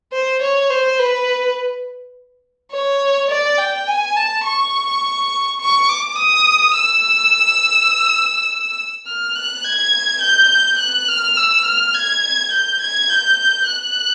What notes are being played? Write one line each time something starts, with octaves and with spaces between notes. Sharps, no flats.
C5
C#5
C5
B4
C#5
D5
G5
G#5
A5
C#6
C#6
D6
D#6
E6
F6
F#6
G#6
G6
F#6
F6
E6
F6
G#6
G6
G#6
G6
F#6